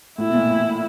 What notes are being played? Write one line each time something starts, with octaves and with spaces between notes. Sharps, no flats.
A2 E4
B2
A#2
A2